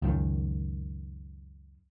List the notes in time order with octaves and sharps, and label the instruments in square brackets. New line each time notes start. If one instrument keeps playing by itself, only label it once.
[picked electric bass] C#2 F#2 D#3